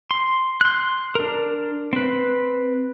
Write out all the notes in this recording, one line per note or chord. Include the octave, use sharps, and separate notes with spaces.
C6
C6 F#6
D4 A#4
C4 B4